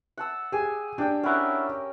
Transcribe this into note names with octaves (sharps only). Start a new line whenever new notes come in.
F#5 A5 E6
G4 G#4 G#5
D4 G4 G5
C#4 E4 F#4 A#4